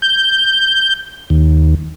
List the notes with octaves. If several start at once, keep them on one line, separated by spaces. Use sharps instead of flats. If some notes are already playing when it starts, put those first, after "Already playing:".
G6
D#2